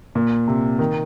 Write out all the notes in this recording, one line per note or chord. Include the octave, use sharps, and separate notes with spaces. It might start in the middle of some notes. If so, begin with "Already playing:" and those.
A#2
C3
D#3